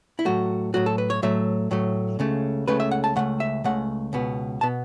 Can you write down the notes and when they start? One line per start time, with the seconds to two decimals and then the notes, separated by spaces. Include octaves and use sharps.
0.19 E4
0.25 A2 F#3 A3 F#4
0.74 A2 F#3 A3 F#4
0.86 A4
0.98 B4
1.10 C#5
1.22 A2 F#3 A3 E5
1.71 A2 F#3 A3
2.19 C#2 C#3 A3
2.68 C#2 C#3 A3 B4
2.80 E5
2.91 F#5
3.04 A5
3.16 C#2 C#3 A3 F#5
3.40 E5
3.64 C#2 C#3 A3 F#5
4.13 C#2 B2 B3
4.61 B2 B3 A5